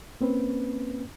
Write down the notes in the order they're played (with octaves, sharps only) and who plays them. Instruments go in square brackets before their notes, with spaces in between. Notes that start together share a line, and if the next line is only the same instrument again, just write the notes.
[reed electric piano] A#3 C4 C#4 B4